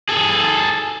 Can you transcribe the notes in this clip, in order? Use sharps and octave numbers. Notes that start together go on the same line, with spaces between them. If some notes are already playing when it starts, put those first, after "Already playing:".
G#4 A4